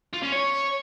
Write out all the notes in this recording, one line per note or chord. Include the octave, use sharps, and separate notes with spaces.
F4
C#4
C#5